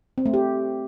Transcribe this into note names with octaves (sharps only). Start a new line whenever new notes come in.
C4
A3
G4